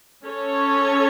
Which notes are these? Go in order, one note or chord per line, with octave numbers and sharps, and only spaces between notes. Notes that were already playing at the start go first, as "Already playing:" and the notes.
C#4 A4 C#5